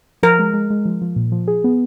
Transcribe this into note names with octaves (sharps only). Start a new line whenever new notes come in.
F3 A#4
G#3
G#3
G#3
F3
F3
A#2
F3
G#4
B3